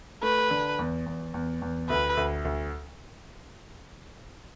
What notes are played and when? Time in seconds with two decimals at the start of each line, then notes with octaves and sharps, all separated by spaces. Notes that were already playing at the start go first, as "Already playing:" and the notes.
0.23 A3 B4
0.50 D3
0.79 E2
1.06 E2
1.34 E2
1.62 E2
1.89 D2 B4
2.17 D2
2.45 D2